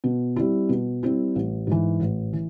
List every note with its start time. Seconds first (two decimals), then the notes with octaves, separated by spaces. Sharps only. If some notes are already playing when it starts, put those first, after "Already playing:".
0.04 B2
0.36 G3 C4 E4
0.69 B2
1.03 G3 C4 E4
1.35 A1
1.67 G#2 E3
2.00 A1
2.33 E3